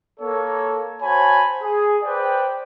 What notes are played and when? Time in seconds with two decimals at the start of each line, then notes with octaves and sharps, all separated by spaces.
0.20 A#3 A4 C#5
1.02 F#4 C5 C#5 G#5 A5 B5
1.61 G#4
2.03 B4 C5 D5 G5